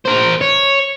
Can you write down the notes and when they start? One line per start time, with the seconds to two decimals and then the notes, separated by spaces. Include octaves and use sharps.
0.06 A#4 C5
0.41 C#5